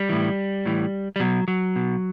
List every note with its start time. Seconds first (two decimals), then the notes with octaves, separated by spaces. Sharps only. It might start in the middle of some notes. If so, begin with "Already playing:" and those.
Already playing: G3
0.09 A2 E3
0.65 A2 E3
1.16 G3
1.20 B2 F#3
1.48 F#3
1.76 B2